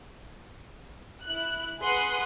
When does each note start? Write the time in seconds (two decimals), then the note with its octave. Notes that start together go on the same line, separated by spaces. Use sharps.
1.25 E4 F#6
1.81 G#4 B4 F#5 C6 D#6 F#6